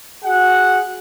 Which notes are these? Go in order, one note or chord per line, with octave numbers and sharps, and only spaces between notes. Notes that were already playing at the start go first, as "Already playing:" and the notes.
F#4 G#4 F#5